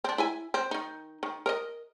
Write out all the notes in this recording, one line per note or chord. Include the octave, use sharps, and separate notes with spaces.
C4 D4
E4 E5 G#5
C4
D#3 D#4
D#3
A#4 C#5 D#5